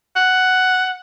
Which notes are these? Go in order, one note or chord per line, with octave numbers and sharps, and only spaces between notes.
F#5